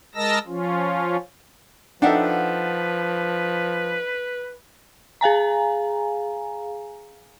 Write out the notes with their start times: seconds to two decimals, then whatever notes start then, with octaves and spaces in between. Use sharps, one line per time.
0.15 G#3 A#4 D#5 A5 E6 A#6
0.47 F3 C#4 F4
2.02 F3 D4 D#4 A4 B4 E5 F#5 G5
5.21 G#4 F5 G#5 A#5